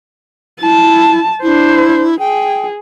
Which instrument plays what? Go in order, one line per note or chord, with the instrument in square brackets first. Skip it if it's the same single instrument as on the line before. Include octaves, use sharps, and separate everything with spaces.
[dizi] E4 [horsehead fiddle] A5
[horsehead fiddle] D4 C5 [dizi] E4
[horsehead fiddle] G#4 [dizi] G5